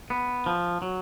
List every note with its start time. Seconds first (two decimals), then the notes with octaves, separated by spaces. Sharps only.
0.10 B3
0.46 F3
0.82 F#3